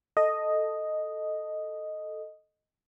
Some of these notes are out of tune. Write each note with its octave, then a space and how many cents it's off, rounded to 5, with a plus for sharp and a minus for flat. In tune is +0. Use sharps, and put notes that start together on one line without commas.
A4 +0 D#5 +0